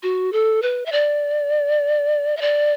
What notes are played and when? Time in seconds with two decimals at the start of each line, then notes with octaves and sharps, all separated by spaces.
0.03 F#4
0.33 A4
0.62 B4
0.86 E5
0.92 D5
2.37 E5
2.41 D5